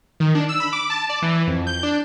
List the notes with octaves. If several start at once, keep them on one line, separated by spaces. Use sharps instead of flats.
D#3
D4
E6
B5
D6
A5
D5
E3
F2
G6
D4